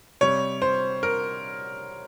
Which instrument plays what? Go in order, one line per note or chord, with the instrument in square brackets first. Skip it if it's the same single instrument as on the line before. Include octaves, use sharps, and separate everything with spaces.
[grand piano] C3 G3 C#5
C5
A#4